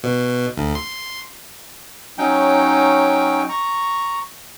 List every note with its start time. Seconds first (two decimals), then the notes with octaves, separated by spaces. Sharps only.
0.04 B2
0.57 D2
0.75 C6
2.18 F#3 C#4 D#4 G5
3.49 A#5 C#6